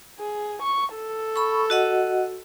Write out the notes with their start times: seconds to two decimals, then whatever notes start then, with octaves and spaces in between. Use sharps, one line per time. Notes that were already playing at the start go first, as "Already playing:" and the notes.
0.20 G#4
0.62 C#6
0.95 A4
1.36 B5 C#6
1.70 F#4 D#5 F#5